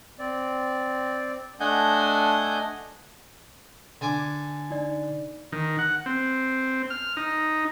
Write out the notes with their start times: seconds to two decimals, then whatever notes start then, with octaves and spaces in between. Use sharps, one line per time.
0.19 C4 D5
1.60 A3 D4 D#5 F#5 G#5 G6
4.01 D3 G#5 D6
4.70 D#4 D5
5.52 D#3
5.79 F#5
6.06 C4
6.90 F6
7.17 D#4